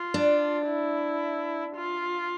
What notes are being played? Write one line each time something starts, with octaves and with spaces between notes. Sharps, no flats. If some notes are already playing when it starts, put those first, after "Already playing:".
Already playing: F4
D4
E4
F4